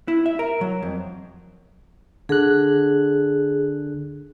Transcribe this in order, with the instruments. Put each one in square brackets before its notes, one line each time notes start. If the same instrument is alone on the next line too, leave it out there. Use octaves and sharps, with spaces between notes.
[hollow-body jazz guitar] E4
E5
A#4
F#3
F2
[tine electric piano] D3 F#6 [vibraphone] G#4